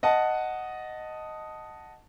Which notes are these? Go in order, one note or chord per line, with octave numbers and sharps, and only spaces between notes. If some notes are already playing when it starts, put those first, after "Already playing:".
D#5 F#5 A5